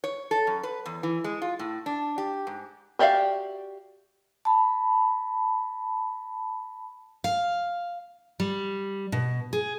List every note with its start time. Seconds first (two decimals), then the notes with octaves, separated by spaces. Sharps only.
0.04 C#5
0.31 A4
0.47 F#2
0.63 B4
0.86 E2
1.03 E3
1.24 G#3
1.42 F4
1.59 A2
1.86 D4
2.18 G4
2.47 G#2
2.99 F#4 G4 D5 E5 F5
4.45 A5 B5
7.24 F5
8.40 G3
9.12 B2
9.53 G#4